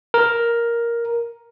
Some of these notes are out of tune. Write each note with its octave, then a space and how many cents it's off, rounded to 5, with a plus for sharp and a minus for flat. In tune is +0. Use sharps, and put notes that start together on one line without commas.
A#4 +5